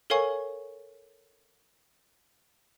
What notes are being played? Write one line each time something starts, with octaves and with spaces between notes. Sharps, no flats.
A4 A#4 C#5 F5 G#5 C#6